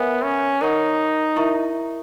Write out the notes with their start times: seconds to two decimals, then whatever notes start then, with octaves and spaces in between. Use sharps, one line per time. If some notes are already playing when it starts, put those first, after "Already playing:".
Already playing: B3 A#4 C#5 E5 G#5 B5
0.24 C#4
0.61 D#4 A#4 C#5 F#5 C#6
1.36 E4 A#4 E5 A#5 C#6